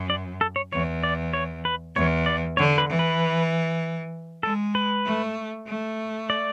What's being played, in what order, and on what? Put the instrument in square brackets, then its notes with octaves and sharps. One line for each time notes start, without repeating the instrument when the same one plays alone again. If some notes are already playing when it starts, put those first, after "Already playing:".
Already playing: [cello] F#2
[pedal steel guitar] D5
A4
C#5
[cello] E2 [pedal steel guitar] C#5
[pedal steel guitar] D5
C#5
B4
[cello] E2 [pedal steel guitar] C#5
[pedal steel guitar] D5
[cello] D3 [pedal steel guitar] C#5
[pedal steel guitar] B4
[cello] E3
[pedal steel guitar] B4
[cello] G#3 [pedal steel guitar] A4
[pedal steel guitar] B4
[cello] A3
A3
[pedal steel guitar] D5